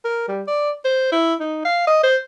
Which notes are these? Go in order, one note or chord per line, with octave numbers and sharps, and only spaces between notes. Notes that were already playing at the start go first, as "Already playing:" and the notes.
A#4
G3
D5
C5
E4
D#4
F5
D#5
C5